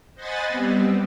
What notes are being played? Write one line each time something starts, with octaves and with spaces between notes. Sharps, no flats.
C5 D#5 F#5 G#5 B5 A6
G3 B3 C4